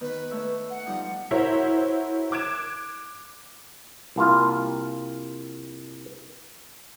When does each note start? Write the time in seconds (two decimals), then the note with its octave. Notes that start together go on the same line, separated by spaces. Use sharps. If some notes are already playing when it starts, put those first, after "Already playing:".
0.01 D#3 B3 B4
0.31 A3 C#5 E5
0.70 F#5
0.86 F3 G3 D#4
1.31 E4 F#4 A#4 C5 C#5 E5
2.32 D6 F#6 G#6 D7 E7
4.16 C2 A#3 F4